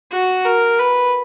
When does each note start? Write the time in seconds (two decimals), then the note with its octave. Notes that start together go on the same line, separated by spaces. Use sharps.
0.12 F#4
0.45 A#4
0.79 B4